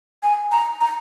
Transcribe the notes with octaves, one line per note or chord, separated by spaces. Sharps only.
G#5
A#5
A#5